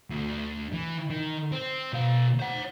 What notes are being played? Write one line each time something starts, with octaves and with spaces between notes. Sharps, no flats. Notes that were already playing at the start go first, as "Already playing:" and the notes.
D2
E3
D#3
C4
B2 F5
C5 F#5